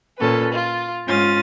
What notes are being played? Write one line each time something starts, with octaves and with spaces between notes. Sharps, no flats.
A#2 C#4 A4 B4
F4
G#2 G#3 C#4 F4 D#6 A6